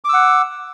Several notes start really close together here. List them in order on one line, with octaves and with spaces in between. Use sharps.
D6 E6 F#5